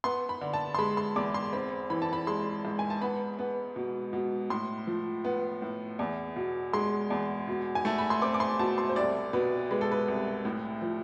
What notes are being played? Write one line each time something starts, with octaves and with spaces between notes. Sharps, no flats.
B3 C6
B5
D3
A5
C6
G#3 B5
C6
E2 D6
C6
C4 B5
E3 B5
A5
B5
G#3 C6
G#2
G#5
A5
B3 B5
B3
B2
B2
A2 C6
F3
B3
A2
E2
B2
G#3 C6
E2
B2
G#5
A3 A5
B5
C6
C4 D6
D6
C6
B2 A5
C6
C5
C2 D5
B2 B4
G#3 B4
A4
B4
C2
A2
F3